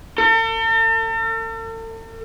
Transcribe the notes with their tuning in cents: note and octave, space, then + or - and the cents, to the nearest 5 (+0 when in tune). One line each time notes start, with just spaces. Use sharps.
A4 +45